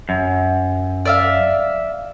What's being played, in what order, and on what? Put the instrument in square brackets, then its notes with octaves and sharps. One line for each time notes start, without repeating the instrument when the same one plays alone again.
[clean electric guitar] F#2
[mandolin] D5 E5 F5